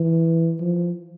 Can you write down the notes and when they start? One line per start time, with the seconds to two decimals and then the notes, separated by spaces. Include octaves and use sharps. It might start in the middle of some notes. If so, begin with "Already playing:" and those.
Already playing: E3
0.60 F3